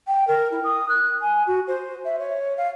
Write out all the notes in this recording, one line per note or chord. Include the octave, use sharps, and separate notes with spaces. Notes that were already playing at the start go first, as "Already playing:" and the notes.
G5
A#4
E4
D#6
F#6
G#5
F#4
C5
E5
C#5
F5